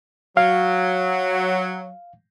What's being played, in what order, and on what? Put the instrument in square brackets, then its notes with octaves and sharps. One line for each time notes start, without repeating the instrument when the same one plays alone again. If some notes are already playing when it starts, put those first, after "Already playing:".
[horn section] F#3 [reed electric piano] F5